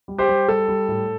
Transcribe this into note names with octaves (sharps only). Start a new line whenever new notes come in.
G3
G4 C5
G3
G3 A4
G3
A2